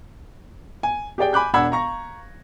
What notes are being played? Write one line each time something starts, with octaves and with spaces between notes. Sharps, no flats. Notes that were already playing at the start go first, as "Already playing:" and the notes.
G#5
G4 G#4 D5 G5
G#5 B5 D6 F#6 G6
E1 D4 F#5 B5 E6 G#6
F5 A#5 C#6 A#6